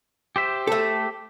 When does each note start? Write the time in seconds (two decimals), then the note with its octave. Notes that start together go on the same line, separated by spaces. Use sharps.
0.36 G4 C5 E5
0.67 A3 A4